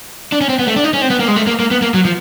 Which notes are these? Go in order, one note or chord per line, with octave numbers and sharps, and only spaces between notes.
D4
C#4
C4
B3
A3
D4
D#4
C#4
C4
B3
A#3
G#3
A3
A#3
A#3
B3
A#3
F#3
F3